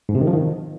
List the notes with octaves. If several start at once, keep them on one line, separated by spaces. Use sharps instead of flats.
G#2
C3
D#3
F3
D#3